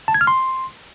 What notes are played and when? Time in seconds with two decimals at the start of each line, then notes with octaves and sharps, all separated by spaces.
0.08 A5
0.14 G#6
0.21 F6
0.27 C6